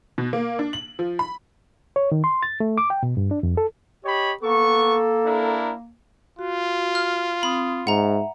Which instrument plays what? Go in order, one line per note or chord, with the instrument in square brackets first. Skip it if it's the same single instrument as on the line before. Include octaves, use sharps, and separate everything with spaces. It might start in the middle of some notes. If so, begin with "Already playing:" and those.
[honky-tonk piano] B2
A#3
D4
F#7
F3
B5
[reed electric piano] C#5
D#3
C6
A6
A3
D6
G5
B2
G2
D4
F2
A4
[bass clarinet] G4 [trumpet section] C#5 D#5 B5
[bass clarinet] A#3 [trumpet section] B3 C#6 [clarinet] A4
[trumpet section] D4 E4 A#4
[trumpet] F4 [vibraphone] F#4
[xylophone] F6
[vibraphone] C4 D#6 [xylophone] B5
[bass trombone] G#2 [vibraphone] E5 [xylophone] F#5 A#5